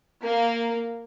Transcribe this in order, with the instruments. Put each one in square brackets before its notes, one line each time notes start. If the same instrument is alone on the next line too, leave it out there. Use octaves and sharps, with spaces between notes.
[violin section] A#3